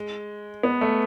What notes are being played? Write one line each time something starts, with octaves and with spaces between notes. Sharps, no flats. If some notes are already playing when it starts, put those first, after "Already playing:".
Already playing: G#3
B3
A3